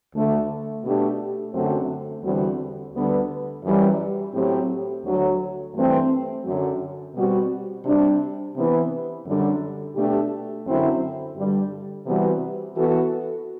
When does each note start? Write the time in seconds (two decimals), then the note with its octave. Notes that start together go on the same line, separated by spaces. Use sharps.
0.13 D2 D3 A3
0.84 B2 A3 D4 G4
1.54 F#2 D3 A3 C4 F#4
2.24 E2 D3 G3 C4 F#4
2.94 D2 D3 G3 B3
3.64 F#2 E3 G3
4.34 A2 F#3 C4 G4
5.04 D2 D3 F#3
5.75 G2 E3 A3 C4
6.45 F#2 D3 F#3
7.15 B2 G3 C4 F#4
7.85 C3 G3 D4
8.56 C3 E3 B3 E4
9.26 F#2 D3 G3 D4
9.95 B2 A3 D4 G4
10.67 F#2 D3 F#3 C4 E4
11.37 G2 D3 G3
12.07 C3 E3 G3 B3 F#4
12.76 E3 B3 F#4 A4